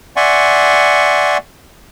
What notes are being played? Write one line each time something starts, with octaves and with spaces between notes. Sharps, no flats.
D5 E5 F#5 G#5 C6 C#6